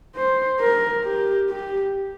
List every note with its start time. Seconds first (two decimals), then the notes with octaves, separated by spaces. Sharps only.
0.16 C5
0.60 A#4
1.05 G4
1.49 G4